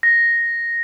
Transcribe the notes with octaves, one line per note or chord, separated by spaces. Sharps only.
A#6